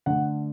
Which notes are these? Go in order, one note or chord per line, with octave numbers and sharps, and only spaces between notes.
D3 A3 F#5